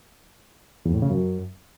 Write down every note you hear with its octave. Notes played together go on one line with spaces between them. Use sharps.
E2
A2
C#3
F#2